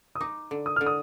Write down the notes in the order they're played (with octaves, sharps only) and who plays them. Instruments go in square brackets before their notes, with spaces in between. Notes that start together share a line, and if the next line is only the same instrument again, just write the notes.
[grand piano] D#6
[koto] D#4 [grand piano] D6
[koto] D3
[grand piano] D#6
[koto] D3 [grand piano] F6
[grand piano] D#6